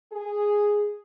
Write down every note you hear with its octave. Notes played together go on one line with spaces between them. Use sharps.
G#4